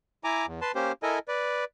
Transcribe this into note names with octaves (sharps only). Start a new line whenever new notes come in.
E4 G#5 A#5 D6
E2
B4 A5 C6
A#3 C#4 G4 C5
E4 A4 A#4 D#5 G#5
B4 D5